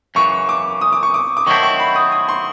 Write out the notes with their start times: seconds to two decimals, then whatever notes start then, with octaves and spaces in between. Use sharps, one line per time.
0.15 F#2 C#3 E3 C#6
0.49 D6
0.81 D#6
0.93 D6
1.03 C#6
1.14 D6
1.37 D6
1.46 D#3 F#3 A3 C4 E4 C#6
1.63 C#6
1.80 B5
1.96 D#6
2.12 D#6
2.29 C6